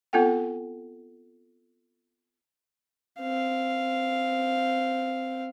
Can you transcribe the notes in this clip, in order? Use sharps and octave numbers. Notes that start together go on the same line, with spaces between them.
B3 C4 F4 A4 F#5 G5
C4 F5